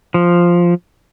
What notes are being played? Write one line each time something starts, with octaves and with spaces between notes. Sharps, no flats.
F3